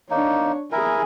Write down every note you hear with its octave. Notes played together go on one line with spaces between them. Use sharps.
A#3 D4 D#4 C#5
E4 G#4 A#4 G#5